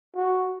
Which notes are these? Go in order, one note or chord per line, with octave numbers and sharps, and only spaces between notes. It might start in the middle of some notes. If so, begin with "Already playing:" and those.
F#4